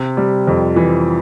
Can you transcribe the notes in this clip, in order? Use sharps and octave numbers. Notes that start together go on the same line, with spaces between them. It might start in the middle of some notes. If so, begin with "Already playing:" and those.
Already playing: C3
G3
F2
E3